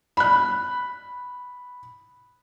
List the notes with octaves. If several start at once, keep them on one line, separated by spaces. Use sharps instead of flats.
B5 F#6